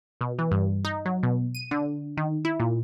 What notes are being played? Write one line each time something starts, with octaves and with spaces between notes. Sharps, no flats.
B2
E3
G2
D#4
F#3
B2
D#7
D3
D#3
E4
A#2